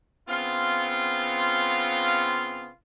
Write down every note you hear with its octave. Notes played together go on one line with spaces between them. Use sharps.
C#3 B3 C4 F4